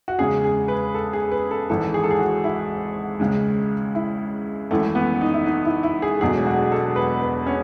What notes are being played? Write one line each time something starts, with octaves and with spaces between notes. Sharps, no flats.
F#4
E2 C#3 G#3 G#4
G#4
B4
A4
G#4
B4
A4
G#1 G#2 E3 A4
G#4
A4
G#4
F#4
E4
C#2 C#3 G#3
E4
G#1 F#2 E3 A3
B3
D#4
E4
D#4
E4
E4
G#4
E1 E2 B2 F#3 A3 G#4
F#4
A4
B4
B4
C#4